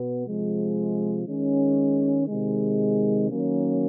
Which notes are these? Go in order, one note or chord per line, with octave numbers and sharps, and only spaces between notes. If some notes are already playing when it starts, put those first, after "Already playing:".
Already playing: B2 B3
C3 F3 G#3
D#3 G#3 C#4
C3 D#3 G#3
D#3 F#3 A#3 C#4